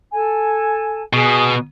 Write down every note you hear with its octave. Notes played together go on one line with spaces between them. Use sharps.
A4 G#5 A5
B2 G#4